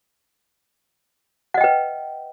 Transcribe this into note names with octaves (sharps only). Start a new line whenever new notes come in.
B4 D#5 F#5 G5